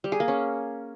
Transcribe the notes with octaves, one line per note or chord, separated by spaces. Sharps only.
G3
G#4
A#3
C#4